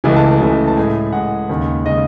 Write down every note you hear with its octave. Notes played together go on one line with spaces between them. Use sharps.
C#2 C#3 E3 A3 G#5
A5
A5
C#2 C#3 E3 A3
A5
A2 G#3 G#5
A2 G#3 F#5
D#2 C#3 G#3
C#3 G#3 D#5